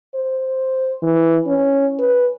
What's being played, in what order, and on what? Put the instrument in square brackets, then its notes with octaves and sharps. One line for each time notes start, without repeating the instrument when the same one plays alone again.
[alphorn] C5
E3
C#4
B4